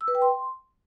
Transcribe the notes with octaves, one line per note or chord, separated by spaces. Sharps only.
E6
B4
G5
C6